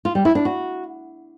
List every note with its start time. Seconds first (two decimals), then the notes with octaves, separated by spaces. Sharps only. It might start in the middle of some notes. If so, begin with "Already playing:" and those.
0.05 F4
0.15 G3
0.25 E4
0.35 D4
0.45 F#4